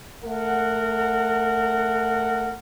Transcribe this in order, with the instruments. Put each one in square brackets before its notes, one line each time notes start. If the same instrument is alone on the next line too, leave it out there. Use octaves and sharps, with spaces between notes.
[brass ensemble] A3 A#4 F#5